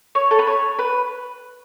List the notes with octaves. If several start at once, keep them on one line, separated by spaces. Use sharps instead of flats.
C#5
A4
B4
C#5
B4